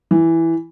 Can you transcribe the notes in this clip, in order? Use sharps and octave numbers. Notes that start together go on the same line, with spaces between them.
E3